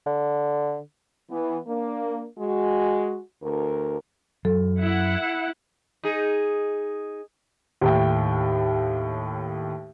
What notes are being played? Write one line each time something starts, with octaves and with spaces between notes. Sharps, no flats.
D3
E3 B3
A#3 D4
G#3 F#4
D2 A#4
F#2 F#3 A4
E4 F#5
D#4 G#4
D#2 A2 G5